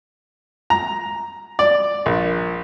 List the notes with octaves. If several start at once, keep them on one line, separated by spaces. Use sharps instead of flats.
A#5
D5
A#1